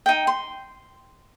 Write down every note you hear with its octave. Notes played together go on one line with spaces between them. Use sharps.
D#4 G5
C6